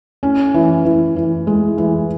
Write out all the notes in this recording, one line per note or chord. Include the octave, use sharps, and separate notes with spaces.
C#4
E3
E3
E3
G#3
E3